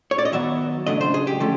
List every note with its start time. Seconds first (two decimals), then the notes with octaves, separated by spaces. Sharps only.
0.11 C#5
0.18 D5
0.25 D#5
0.32 D#3 F#3 B3 E5
0.87 C#3 F#3 A3 D4 D#5
1.01 C5
1.14 G#4
1.27 G4
1.40 D3 F3 A3 C#4